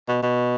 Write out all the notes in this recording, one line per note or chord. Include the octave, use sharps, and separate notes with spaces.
B2
B2